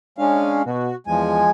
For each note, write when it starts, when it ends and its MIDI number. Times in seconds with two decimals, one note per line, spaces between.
0.18 0.62 56
0.18 0.62 61
0.18 0.62 62
0.18 0.62 77
0.66 0.91 47
0.66 0.95 66
1.07 1.45 40
1.07 1.50 53
1.07 1.50 56
1.07 1.50 80